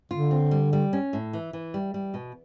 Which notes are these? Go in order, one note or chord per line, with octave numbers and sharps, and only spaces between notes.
D3 F4
C4
G3
G3
C#4
A2
E3
E3
G3
G3
B2